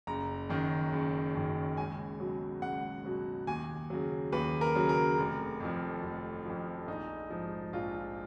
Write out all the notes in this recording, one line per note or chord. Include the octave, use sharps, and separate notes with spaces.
F#1 A#5
F#2 D#3
F#1
F#2 D#3
C#2 G#5
B2 F#3
C#2 F#5
B2 F#3
D#2 G#5
C#3 F#3
D#2 B4
A#4
C#3 F#3
A#4
F1
F2 F3
F1
F2 F3
A#1 D#4
G#2 F3
A#1 F4